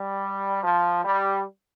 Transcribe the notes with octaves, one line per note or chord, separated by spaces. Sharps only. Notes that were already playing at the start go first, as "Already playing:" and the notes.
Already playing: G3
F3
G3